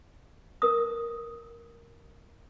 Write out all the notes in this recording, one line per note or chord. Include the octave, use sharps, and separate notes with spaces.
A#4 D#6